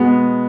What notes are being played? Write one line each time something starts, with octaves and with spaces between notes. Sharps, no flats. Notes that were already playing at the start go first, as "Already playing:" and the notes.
Already playing: B2 G#3 B3